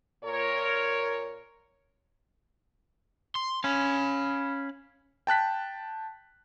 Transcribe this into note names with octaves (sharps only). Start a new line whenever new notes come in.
A#2 A#4 C#5
C6
C#4 F5 B5
G5 A5 F#6 B6